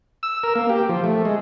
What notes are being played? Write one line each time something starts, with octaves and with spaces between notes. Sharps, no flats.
E6
A#4
A#3
G4
F3
A3
G#3